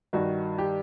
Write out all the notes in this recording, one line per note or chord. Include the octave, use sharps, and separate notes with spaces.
G2 D#3 F#4
G4